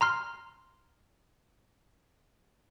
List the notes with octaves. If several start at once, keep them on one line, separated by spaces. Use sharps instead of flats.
A#5 C6 F6